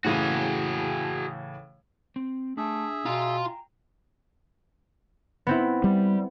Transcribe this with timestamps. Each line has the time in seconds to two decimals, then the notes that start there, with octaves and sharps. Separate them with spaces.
0.04 A2 C#3 E3 F#4 G#4
2.16 C4
2.57 A3 D4 G#4 E5
3.06 B2 F4 F5 G5 G#5 A#5
5.47 B3 C4 E4
5.84 G3